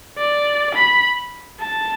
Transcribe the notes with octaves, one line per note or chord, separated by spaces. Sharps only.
D5
B5
A5